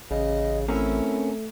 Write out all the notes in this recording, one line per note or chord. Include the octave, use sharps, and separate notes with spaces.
A1 C#3 D#5
A3 C4 C#4 E4 A#4